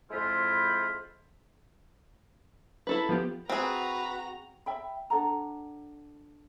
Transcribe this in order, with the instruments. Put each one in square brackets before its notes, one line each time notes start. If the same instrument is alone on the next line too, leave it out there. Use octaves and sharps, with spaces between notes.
[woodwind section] F2 G#3 E4 F4 C5 B5
[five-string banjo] E4 A4 B4
[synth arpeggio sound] F3 B3 G4
[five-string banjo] C4 G#4 [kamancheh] F#4 A#5 [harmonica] B4
[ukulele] E5 G5 B5
D4 A4 F#5 A#5